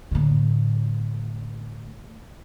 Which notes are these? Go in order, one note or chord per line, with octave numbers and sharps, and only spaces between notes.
A2 D3